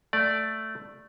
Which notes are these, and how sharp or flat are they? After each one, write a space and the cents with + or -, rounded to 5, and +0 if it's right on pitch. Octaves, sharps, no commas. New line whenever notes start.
A3 +0 D5 +0